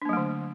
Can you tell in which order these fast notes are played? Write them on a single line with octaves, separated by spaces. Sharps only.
D4 A#3 F#3 A3 D3